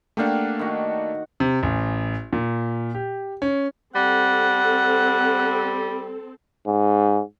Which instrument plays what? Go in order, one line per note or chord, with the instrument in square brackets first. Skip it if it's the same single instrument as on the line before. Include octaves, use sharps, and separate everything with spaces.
[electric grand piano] A3 A#3 D4 [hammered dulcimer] G4 F5 F#5
[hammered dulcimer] D#3 F#4
[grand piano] C3
A1
A#2
G4
C#4
[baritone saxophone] G3 [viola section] C4 A4 [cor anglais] F#5
[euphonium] G#2